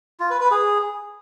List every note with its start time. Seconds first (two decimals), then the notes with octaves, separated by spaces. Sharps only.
0.20 F4
0.30 B4
0.40 B4
0.51 G#4